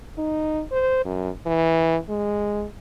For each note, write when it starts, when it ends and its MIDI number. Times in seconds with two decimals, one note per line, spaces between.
0.18 0.62 63
0.72 1.01 72
1.05 1.29 42
1.46 1.97 52
2.08 2.65 56